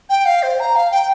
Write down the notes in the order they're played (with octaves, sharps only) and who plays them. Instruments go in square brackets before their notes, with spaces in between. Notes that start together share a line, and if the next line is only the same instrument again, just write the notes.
[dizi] G5
F5
C5
A#5
F5
G5